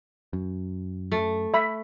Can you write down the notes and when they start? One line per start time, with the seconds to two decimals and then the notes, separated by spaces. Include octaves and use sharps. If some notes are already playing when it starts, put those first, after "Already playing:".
0.33 F#2
1.12 A3
1.54 E5 B5